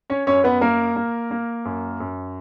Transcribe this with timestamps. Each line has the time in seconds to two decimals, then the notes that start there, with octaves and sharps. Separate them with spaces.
0.10 C#4 C#5
0.27 F#2 C#4 C#5
0.44 B3 B4
0.61 A#3 A#4
0.96 A#3
1.31 A#3
1.65 F#2
2.00 F#2